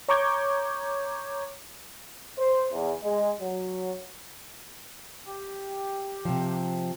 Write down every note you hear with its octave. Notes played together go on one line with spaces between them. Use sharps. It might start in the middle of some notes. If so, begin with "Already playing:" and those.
C#5 A#5 C#6 D6 G6 G#6
C5
E2
G#3
F#3
G4
C3 F3